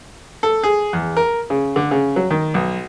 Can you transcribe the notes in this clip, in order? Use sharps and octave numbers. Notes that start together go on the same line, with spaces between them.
A4
G#4
E2
A#4
C#3
D3
C#3
F#3
D#3
B1